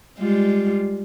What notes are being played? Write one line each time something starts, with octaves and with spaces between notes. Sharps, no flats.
G3 G#3 F4